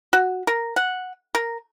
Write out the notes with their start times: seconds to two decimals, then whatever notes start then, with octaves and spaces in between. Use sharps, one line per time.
0.13 F#4
0.47 A#4
0.76 F#5
1.35 A#4